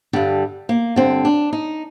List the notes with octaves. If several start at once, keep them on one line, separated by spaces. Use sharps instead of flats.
G2 D3 G3
A#3
G2 D3 C4
D4
D#4